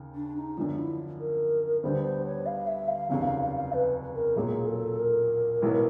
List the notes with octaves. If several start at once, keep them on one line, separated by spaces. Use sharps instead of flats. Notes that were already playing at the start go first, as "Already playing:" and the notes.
Already playing: D#2 C#3
D4
D#4
F#2 D3 F3 D4
E4
A#4
D2 D3 G3 B3 C5
C5
C#5
F5
E5
F5
F1 D#2 C#3 F#3 F5
F5
F5
F5
B4
A#4
B1 A#2 F#3 A#3 G#4
A4
A#4
B1 A2 F#3 B3 E4